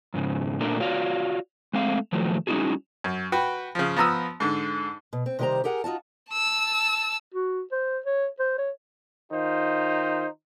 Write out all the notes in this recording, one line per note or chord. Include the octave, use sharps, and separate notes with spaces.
F2 G#2 C#3
A#2 A3 D4 A#4
F4 F#4 C#5 D5 F5
G#3 A3 C4 F5
A2 D#3 F3 F#3 A3
G3 C#4 D#4 E4 F#4 G#4
F#2
F#4 B4 G5
C#3 F3
F3 B3 A#5 D#6 E6
G#2 D3
B2
C4
C3 D#3 G3 G4 C5 A#5
G4 G#4 A#4 F#5 G#5
D#4 F4 F#4 A5
A5 E6
F#4
C5
C#5
C5
C#5
D#3 D#4 F4 C5